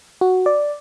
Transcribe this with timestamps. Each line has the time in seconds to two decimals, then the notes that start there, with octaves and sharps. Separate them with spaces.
0.21 F#4
0.46 D5